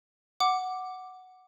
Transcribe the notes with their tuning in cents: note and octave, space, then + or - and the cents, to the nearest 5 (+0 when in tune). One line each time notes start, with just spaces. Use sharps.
F#5 +0 D6 +0